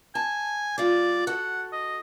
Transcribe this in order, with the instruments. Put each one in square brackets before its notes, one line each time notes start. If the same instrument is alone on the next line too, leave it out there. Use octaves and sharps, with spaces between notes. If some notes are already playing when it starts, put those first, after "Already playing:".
[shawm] G#5 [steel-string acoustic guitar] A5
[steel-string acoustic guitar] G3 F4 [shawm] D5
[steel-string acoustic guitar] F#4 A4 [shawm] F#5
[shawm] D#5